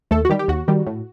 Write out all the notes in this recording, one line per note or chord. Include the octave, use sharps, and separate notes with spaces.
D#2 A3 A4
F#4
D#3 G3 G4
G4
D#2 F#4
D#3 G3
A2